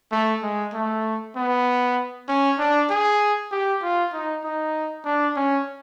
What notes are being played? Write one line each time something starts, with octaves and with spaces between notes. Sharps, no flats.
A3
G#3
A3
B3
C#4
D4
G#4
G4
F4
D#4
D#4
D4
C#4